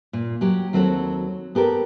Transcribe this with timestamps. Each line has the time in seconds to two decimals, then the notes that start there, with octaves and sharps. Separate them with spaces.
0.13 A#2
0.41 F#3 G4
0.73 D#2 F#3 C4 F#4 A4
1.55 B3 G4 A4 A#4